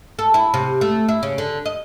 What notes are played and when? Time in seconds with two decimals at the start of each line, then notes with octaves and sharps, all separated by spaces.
0.19 A4
0.34 E4
0.54 C3
0.81 A3
1.09 E4
1.23 C#3
1.38 D3
1.66 D#5